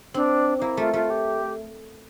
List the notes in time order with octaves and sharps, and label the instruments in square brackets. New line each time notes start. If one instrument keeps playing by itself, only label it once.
[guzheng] C4 [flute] D4
[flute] D4
[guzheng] A#3 [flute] E4
[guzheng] A3 [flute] F4
[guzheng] A3 [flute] F4
[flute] G4